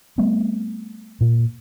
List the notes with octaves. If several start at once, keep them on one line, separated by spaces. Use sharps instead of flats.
G3 A3 B3 C4
A#2